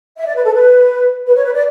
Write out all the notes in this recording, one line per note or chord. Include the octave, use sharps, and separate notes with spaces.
E5
D5
B4
A4
B4
B4
C#5
B4
D5